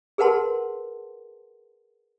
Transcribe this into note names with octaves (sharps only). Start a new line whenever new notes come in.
G#4 A#4 B4 F#5 A5 C6